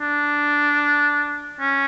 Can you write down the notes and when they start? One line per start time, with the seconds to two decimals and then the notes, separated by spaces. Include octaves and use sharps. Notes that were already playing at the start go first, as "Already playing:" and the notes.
0.01 D4
1.61 C#4